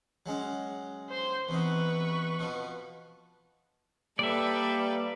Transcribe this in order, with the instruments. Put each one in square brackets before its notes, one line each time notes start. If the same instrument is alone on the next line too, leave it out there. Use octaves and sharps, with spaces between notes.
[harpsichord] F#3 G#3 C#4
[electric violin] C5 C6
[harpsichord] E2 C3 D#4 [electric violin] B4 C#6
[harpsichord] B2 F3
[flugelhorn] G3 [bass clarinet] A#3 [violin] A4 B4 [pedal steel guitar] D5 E5